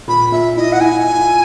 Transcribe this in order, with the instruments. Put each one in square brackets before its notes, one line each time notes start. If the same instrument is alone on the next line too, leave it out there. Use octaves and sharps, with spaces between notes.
[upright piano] A#2 [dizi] B5
[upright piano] A#2 [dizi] E5
[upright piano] E4 [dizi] D#5
[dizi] F#5
[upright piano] E4 [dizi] G#5